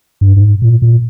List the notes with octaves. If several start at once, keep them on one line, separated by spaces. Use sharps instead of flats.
G2
G2
G#2
A#2
A#2